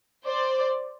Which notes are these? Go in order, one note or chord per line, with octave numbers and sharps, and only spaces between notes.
C5 D5